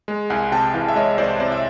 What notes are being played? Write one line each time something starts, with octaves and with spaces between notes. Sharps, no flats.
G#3
C2 F#5 G#5
C3 G5 A5
E3 F5 G5
E5
G#3 C#5 D#5
C2 C5 D5
C3 C5 D5
E5